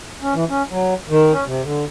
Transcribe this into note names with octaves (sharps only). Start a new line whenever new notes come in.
C#4
E3
C#4
F#3
D#3
C#4
C3
D3